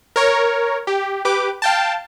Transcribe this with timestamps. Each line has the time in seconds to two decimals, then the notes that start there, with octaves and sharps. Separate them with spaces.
0.16 A#4 C#5
0.87 G4
1.25 G4 B4 D6
1.62 F5 G5 A5